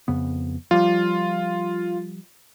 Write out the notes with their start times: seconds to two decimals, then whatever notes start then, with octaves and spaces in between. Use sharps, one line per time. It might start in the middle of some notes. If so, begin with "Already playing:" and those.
0.08 F2 C#3 B3
0.71 F3 G3 F4